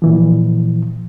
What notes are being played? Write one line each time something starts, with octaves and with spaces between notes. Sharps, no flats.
A#2 E3 F3